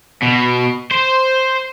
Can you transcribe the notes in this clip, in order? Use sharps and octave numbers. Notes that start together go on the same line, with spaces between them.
B2
C5